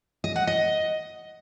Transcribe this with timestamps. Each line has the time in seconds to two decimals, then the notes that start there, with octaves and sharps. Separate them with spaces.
0.24 D#5
0.36 F#5
0.47 D#5